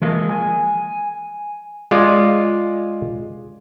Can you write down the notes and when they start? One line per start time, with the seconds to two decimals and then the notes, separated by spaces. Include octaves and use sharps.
0.02 E3 F3 G#3 A#3
0.29 G#5
1.91 G#3 F4 D5